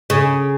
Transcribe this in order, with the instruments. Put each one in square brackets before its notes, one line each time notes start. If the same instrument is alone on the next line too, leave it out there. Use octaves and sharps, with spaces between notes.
[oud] C#3